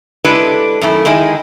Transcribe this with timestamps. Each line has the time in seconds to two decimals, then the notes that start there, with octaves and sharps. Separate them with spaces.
0.25 G#3 D4 E4 G4 A4 B4
0.81 F#2 D#3 A3 E4
1.05 D#3 G#3 D#4 E4 G#4